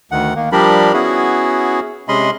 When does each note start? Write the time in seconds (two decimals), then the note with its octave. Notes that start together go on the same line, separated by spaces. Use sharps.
0.12 D2 D#3 F#5
0.36 D#3 A#3
0.52 F3 G3 D4 G4 A#4 B5
0.93 B3 C#4 E4 F#4 G#4
2.08 C3 G#3 C#4 D#5 B5 C6